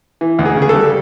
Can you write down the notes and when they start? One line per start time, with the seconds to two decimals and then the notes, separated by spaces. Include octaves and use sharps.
0.21 E3
0.39 D2
0.45 G#4
0.56 C#3
0.62 G#4
0.69 A4
0.75 G3